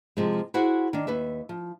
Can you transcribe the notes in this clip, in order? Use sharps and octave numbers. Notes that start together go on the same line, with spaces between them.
C3 F3 G#3
E4 F#4 G#4 C5 F#5
D#3 D4
D#2 B4 E5
F3